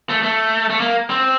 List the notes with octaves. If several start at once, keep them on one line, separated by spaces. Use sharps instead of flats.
A3
A3
A3
A#3
C4